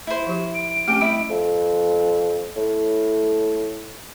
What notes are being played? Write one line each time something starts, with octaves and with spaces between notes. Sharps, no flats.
E4 C5
F3 G4
D7
A3 C4 C#4 G4
G3 E4
F2
A2